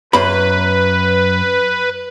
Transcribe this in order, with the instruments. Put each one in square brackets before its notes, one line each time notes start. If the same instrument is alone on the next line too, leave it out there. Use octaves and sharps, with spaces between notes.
[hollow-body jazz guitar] F#2 B5 [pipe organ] B4